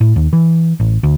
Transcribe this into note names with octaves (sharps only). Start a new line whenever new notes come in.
A2
D#2
E3
A1
D2